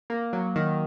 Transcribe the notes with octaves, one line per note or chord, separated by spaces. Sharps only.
A#3
F#3
D#3